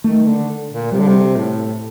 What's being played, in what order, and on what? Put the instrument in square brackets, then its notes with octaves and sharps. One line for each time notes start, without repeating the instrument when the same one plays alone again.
[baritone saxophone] D#3 [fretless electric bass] A3
[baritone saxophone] D3
A#2
[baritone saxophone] C3 [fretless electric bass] G3
[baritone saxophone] D3
C3
A2